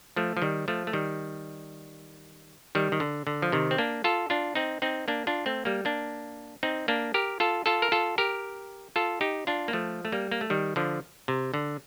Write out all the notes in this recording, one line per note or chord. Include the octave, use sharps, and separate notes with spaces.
F3 A3
F3
D#3 G3
F3 A3
A3
D#3 G3
D#3 G3
D#3
D3
D3
F3
C3 D#3
C4
A#3 D4
F4 A4
D4 F4
C4 D#4
C4 D#4
A#3 D4
D4 F4
A3 C4
G3 A#3
A#3 D4
C4 D#4
A#3 D4
G4 A#4
F4 A4
F4 A4
A#4
F4 A4
G4 A#4
F4 A4
D#4 G4
D4 F4
A#3
F3 A3
A3
G3 A#3
A#3
A3
D#3 G3
D3 F3
C3
D3